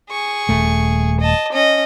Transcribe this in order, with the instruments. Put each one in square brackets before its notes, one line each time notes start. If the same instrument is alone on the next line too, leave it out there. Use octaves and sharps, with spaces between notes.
[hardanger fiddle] G#4 C#6
[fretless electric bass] D#1 A3
[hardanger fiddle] D#5 A5
C#4 D#5